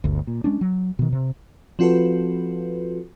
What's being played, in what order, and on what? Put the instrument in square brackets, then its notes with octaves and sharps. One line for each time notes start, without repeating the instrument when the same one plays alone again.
[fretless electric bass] G1 D2
A#2
G#3 C#4 D4
F#3
B2 D#3
C3
[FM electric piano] F3 C4 F4 F#4 A4 B4